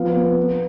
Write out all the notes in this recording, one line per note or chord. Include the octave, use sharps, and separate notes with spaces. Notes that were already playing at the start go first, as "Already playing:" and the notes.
Already playing: F3 B3 F5
B3
B3